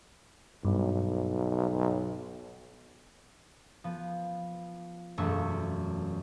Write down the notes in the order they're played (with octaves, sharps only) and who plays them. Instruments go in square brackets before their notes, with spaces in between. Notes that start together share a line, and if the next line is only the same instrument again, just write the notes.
[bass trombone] B1 [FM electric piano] G2
[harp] F3 B3
E1 F#2 A3 C#6 E6